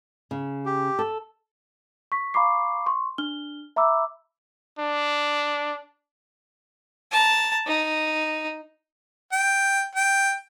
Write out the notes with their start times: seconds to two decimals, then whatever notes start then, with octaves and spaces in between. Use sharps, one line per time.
0.31 C#3
0.66 G4
0.99 A4
2.12 C#6 B6
2.34 F5 A#5 B5 C#6 D6 C7
2.86 C6 C#6
3.18 D4 F6 G7
3.76 E5 A#5 B5 D6 E6
4.79 D4
7.12 A5 A#5
7.66 D#4
9.32 G5
9.95 G5